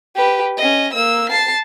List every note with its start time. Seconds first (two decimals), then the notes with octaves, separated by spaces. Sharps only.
0.15 G4 B4
0.57 C#4 D#5
0.93 A#3 E6
1.29 A5 C7